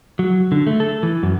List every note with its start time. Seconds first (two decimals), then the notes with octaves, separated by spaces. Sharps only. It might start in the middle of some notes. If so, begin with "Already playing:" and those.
0.19 F#3
0.52 D3
0.67 A3
0.80 A4
1.03 E3
1.23 F#2